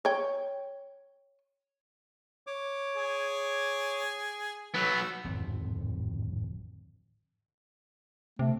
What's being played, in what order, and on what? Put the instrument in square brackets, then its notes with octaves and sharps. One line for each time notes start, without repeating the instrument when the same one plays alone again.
[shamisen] C#5 G5
[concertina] C#5 D6
[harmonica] G#4
[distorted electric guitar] F#3 B3 [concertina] E6
[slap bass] D1 G#1 F2 C4
[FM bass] C3 [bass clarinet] A3